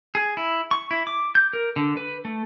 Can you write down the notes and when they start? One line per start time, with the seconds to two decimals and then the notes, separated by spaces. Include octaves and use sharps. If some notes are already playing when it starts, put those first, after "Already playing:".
0.15 G#4
0.37 E4
0.71 C#6
0.91 E4
1.07 D6
1.35 G6
1.53 A#4
1.76 D3
1.97 B4
2.25 A3